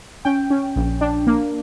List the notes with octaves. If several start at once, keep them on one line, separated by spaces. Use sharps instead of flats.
C#4 G5
C#4
A#1
D4
A#3